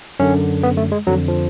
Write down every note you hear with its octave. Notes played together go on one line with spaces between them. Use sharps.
F#2 D3 C#4
B3
A3
G#3
F2 D3 F#3
F3